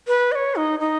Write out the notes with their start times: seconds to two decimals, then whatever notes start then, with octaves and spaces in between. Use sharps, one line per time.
0.08 B4
0.32 D#5
0.35 C#5
0.56 D#4
0.80 D#4